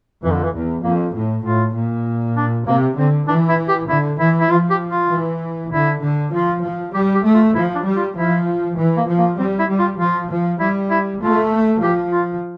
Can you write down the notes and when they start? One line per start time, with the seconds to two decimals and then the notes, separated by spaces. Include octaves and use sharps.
0.23 F2 E3
0.33 D3
0.44 E3
0.54 E2
0.84 F2 A#3
1.15 A2
1.45 A2 F4
1.75 A#2
2.37 D4
2.67 C3 A#3
2.97 D3 C4
3.28 E3 D4
3.49 E4
3.68 G4
3.89 D3 E4
4.20 E3 E4
4.40 E4
4.50 F3 F4
4.70 G4
4.91 F4
5.11 E3
5.72 D3 E4
6.03 D3
6.33 F3 F4
6.64 F3
6.94 G3 G4
7.15 G4
7.25 A3
7.34 F4
7.55 F3 E4
7.75 D4
7.86 G3
7.97 F4
8.17 F3 E4
8.77 E3
8.97 A#3
9.08 F3
9.19 A#3
9.38 G3 C4
9.59 E4
9.68 G3
9.79 F4
9.99 F3 F4
10.30 F3
10.60 G3 E4
10.90 E4
11.21 A3 F4
11.83 F3 G4
12.12 F4